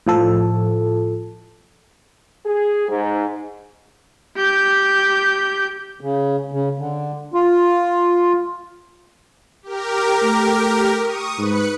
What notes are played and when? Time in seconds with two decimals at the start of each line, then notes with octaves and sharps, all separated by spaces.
0.07 A2 F3 A4
2.45 G#4
2.88 G#2
4.37 G4 G6
6.01 C#3
6.52 C#3
6.78 D3
7.34 F4
9.63 G4 A#4
10.23 A3
11.00 C#6 D#6
11.38 G#2 B4 F#6 C#7